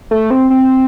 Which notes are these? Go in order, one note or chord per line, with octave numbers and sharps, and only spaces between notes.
A3
C4
C4